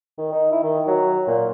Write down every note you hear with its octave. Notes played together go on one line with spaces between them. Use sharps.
D#3
D#4
E4
D#3
F#3
A#2